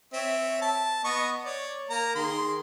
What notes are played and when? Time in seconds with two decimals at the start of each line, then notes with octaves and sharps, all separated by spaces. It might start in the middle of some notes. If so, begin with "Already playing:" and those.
0.13 C4 C#5 E5
0.62 A5
1.04 B3 D#5 C#6
1.45 C#5 D5
1.90 A#3 A#5
2.16 D#3 G#4 C6